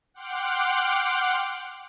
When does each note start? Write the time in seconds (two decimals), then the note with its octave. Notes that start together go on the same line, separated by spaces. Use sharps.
0.14 F#5 G5 C6 D6 F6 F#6